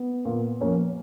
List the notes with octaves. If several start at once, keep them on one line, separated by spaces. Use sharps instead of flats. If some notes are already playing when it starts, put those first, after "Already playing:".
Already playing: B3
A#2
F3 A#3 C#4